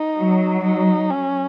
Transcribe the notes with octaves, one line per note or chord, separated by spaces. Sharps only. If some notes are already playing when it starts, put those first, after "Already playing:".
Already playing: D#4
F#3
D#4
C#4